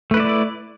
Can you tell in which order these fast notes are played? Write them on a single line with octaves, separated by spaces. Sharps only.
A3 B4 E4 D5